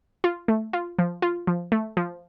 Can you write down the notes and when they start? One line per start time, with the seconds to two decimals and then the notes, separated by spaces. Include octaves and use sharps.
0.24 F4
0.48 A3
0.73 F4
0.99 F3
1.22 F4
1.47 F3
1.72 A3
1.97 F3